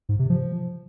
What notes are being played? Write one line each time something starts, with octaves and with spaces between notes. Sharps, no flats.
G#2
C3
F3